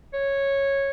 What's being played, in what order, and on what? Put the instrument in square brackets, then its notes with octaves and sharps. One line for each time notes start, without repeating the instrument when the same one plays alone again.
[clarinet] C#5